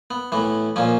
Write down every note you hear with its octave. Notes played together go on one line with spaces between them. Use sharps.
B3
A2 E3 B3
A#2 F3 C#4